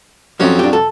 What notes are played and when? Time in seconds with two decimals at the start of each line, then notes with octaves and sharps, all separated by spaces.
0.40 F2 F3 F#3 C#4
0.59 D4 G4
0.73 A4